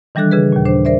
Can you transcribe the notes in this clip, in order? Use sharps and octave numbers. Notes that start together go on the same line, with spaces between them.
D#3 E3 G3 D4 A4 F#6
C#3 G#4 B4
D#2 A#2
D4 C5
A#4 C5 D5 E5